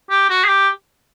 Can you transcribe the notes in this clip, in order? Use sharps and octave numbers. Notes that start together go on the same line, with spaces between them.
G4
F#4
G#4
G4